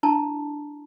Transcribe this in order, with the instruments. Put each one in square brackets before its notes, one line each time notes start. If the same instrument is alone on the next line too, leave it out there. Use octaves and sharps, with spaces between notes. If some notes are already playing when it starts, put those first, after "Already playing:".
[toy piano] D4 E4 A5 A#5